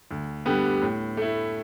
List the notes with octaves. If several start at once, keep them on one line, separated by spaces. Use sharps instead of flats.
D2
D3 G3 B3 G4
A2
A3 E4